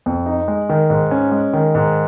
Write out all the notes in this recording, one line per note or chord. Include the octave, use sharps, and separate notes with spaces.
F2
D#4
G#3
D#3
G#2
C#4
G#3
D#3
G#2